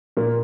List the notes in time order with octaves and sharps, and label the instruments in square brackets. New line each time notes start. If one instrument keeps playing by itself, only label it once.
[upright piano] A#2 A#3